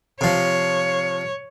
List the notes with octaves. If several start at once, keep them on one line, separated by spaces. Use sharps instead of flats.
C3 F3 C#5